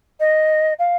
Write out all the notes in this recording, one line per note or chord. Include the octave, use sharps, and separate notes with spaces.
D#5
F5